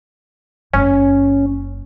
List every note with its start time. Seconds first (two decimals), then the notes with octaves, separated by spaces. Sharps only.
0.74 F#1 C#4